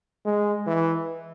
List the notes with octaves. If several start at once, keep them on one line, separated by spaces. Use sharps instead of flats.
G#3
E3